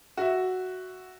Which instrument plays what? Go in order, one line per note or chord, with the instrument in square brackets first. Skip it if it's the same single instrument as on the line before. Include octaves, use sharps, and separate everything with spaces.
[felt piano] F#4 E5